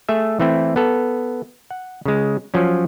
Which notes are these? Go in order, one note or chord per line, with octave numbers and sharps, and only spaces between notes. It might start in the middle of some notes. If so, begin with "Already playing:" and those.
A3 G#4 E5
E3 A3 C4 E4
B3 A4
F#5
C#3 G#3
F3 F#3 C#4